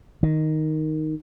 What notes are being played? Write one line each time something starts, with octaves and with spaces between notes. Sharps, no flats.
D#3